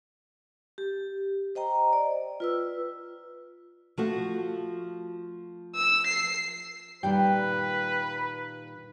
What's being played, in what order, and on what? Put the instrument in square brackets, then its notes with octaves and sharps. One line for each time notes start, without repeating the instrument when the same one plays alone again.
[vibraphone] G4
C5 D#5 G5 A#5
D5
F4 B4 E6
[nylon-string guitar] F3 A3 F#4
[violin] E6
C7
[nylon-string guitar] A#2 D#3 G3 [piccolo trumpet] B4 [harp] G5